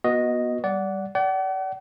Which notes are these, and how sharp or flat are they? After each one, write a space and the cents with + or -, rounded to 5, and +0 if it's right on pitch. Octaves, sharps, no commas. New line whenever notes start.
B3 -30 F#4 -15 D#5 +0
G3 +0 D5 -20 F#5 +0
D5 -25 F#5 +40